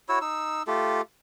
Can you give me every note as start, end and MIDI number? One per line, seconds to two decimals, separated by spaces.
0.09 0.19 64
0.09 0.19 66
0.09 0.19 73
0.09 0.19 88
0.21 0.63 63
0.21 0.63 88
0.67 1.01 57
0.67 1.01 65
0.67 1.01 67
0.67 1.01 69